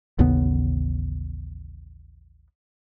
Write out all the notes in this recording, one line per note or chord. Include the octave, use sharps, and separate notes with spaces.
A1 D#2 C#3 B3